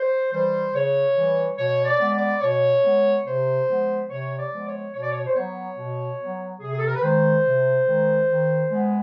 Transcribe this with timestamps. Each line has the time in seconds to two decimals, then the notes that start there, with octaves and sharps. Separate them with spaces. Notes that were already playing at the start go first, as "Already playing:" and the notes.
Already playing: C5
0.31 E3 G3 C5
0.73 C#3 C#5
1.15 E3 G3
1.57 B2 C#5
1.85 D5
1.99 G#3 B3
2.14 D5
2.41 B2 C#5
2.83 G#3 B3
3.25 C3 C5
3.66 F3 G#3 B3
4.09 C3 C#5
4.37 D5
4.51 F3 G#3 B3
4.65 C#5
4.93 B2 C#5
5.02 D5
5.11 C#5
5.26 C5
5.34 F#3 B3 C#5
5.77 B2
6.18 F#3 B3
6.60 C3 G#4
6.72 G#4
6.79 A4
6.86 A#4
6.95 B4
7.02 D#3 G#3 C5
7.44 C3
7.86 D#3 G#3
8.28 D#3
8.70 G#3 B3